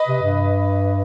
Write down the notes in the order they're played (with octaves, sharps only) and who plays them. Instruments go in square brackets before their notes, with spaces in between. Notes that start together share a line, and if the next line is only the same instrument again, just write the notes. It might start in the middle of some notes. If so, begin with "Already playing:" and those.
Already playing: [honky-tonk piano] B4 D#5
[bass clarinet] C3
G2